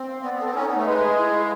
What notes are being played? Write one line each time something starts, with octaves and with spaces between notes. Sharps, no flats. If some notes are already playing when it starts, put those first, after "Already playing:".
Already playing: C4
F5
B3 D5
B3
A4
C4
C#4 D#4
B3
A3 D#4
G#3 B4
G#4
E4
F5